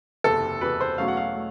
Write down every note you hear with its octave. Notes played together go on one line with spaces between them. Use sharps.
F#1 E2 C3 A4
F#1 E2 C3 B4
C5
E2 B2 F#3 A3 C#4 F5
F#5
F5
A3